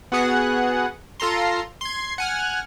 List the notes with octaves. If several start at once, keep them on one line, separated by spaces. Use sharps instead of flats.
B3 F#4 G#4 F#5
F4 A4 A#5 C6
C6 G#6
F#5 G#5 F6